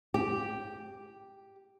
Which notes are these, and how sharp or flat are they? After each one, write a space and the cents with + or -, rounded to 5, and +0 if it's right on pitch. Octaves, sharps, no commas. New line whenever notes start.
G4 +0